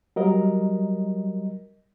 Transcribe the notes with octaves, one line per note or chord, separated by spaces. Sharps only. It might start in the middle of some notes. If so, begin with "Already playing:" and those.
F#3 G3 A#4 D#5